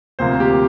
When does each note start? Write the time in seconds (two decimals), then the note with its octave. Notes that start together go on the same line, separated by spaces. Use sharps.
0.19 D2 C3 F3 A#3 C5
0.40 G4